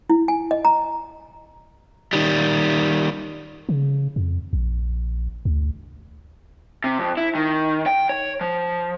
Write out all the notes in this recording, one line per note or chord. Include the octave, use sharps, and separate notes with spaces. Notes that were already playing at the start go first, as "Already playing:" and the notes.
E4
G#5
D#5
A#5
D#3 G3
C#3
F2
A#1
D2
C3
F2
E4
D#3
G5
C#5
F3